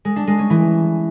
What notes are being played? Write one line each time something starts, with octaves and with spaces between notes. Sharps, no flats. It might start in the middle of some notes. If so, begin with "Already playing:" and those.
G#3
D4
G#3
C#4
E3